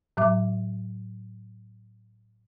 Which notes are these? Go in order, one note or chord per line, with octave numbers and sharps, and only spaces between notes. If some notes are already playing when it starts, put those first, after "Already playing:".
A2 F#3 E5 D6